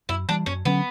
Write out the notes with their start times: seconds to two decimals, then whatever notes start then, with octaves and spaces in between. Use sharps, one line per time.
0.09 F#2 E4
0.28 E3 G3 D4
0.46 F#2 C#4
0.65 D3 F#3 B3 C#4